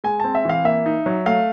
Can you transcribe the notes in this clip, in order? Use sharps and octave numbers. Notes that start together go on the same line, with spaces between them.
G#3 G#5
C4 A5
E5
E3 F5
A#3 E5
D#4
F#3
A3 F5